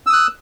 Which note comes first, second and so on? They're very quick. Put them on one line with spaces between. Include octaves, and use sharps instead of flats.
E6 D#6 F#6